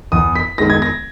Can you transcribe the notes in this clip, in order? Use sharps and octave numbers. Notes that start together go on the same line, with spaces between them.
E2 D#6
B6
D#3 G#3 B3 A#6
G#6
A#6